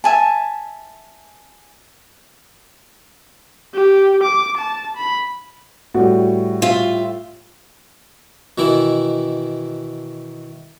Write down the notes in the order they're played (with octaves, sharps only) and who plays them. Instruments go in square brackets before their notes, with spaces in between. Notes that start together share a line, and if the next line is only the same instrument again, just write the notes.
[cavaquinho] E5 G#5 A5
[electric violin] G4
D6
A5
B5
[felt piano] A2 G3 [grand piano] F#4
[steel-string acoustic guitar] F4 E5
[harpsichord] B2 D#3 E3 E4